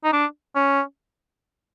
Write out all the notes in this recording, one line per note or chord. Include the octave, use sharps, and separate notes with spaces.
D#4
D4
C#4